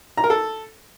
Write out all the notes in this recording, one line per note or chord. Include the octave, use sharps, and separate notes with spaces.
A#5
A#4
A4